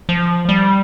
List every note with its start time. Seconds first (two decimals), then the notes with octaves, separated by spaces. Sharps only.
0.09 F3
0.49 G3